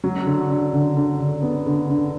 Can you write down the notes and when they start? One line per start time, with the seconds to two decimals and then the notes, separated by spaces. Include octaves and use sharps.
0.04 F#3
0.26 D3
0.50 D3
0.73 D3
0.97 D3
1.20 D3
1.43 B3
1.66 D3
1.90 D3